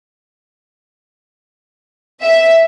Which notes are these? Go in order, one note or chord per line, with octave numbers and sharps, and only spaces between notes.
E5